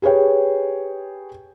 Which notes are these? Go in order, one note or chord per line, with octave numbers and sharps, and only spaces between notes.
G4 G#4 B4 C#5 G5